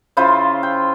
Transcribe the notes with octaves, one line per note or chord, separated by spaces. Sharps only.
C#3 E4 F4 C5
G5